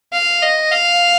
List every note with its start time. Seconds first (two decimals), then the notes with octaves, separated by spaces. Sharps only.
0.13 F5
0.42 D#5
0.72 F5